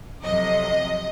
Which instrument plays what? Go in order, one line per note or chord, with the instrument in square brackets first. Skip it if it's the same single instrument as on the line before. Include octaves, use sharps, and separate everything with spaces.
[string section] F2 C3 F#3 D#5